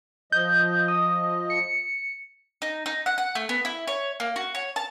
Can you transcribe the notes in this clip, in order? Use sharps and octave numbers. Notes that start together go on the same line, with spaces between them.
F3 D#5 G6
D#6
C#7
D#4
D#4
F#5
F#5
A3
B3
E4
C#5
A#3
F#4
C#5
A5